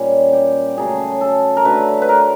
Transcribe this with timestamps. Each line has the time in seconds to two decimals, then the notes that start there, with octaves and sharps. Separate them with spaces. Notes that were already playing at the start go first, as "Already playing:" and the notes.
Already playing: A#2 G3 C#4
0.33 G4
0.77 C#3 F#3 A3 G#4
1.21 A4
1.57 A#4
1.65 D3 F#3 A3 B4
2.02 B4
2.09 A#4